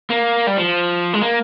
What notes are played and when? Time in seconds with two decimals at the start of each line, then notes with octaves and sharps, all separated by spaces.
0.10 A#3
0.47 G3
0.57 F3
1.14 G#3
1.21 A#3